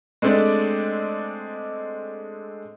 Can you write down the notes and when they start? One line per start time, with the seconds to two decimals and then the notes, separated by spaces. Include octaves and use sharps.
0.22 G#3 A3 C4 D4 D5